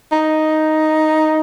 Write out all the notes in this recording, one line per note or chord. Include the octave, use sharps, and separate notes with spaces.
D#4